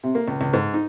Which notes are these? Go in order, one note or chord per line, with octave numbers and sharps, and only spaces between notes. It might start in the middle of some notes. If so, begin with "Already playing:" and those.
C3
A#3
C#2
C#2
G#2
D#4